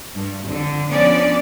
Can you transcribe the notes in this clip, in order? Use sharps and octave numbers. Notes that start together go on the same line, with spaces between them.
G2
F2 D3
F3 B3 C#4 D4 D5